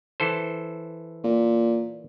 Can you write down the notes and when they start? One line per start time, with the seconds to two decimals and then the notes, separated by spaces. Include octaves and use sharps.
0.20 E3 A4 C5
1.24 A#2